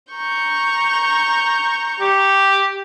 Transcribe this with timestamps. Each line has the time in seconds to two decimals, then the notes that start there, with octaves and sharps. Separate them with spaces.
0.12 A#5 C#6 G6
2.00 G4